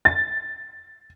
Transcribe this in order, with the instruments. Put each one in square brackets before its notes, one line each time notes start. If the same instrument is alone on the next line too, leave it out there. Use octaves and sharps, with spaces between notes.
[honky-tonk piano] A6